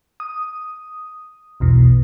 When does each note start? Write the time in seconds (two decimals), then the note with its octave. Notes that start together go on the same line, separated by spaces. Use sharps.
0.20 D#6
1.60 B1 E2 B2